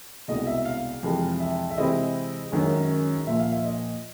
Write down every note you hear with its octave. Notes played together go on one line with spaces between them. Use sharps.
C2 B2 G#3 D#5
E5
F5
F2 C3 E3 G#3
E5
E5
C3 E3 G#3 C4 E4 D#5
F#2 D#3 G#3 C#4
A#2 F3 A#3 E5
F5
E5
D#5